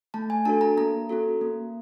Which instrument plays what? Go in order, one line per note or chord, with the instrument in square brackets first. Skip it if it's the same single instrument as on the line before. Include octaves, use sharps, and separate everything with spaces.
[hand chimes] A3 A5
G#5
D4 F#4 A4 A5
A#5
A#3 A#5
C#4 F#4 A4
A#3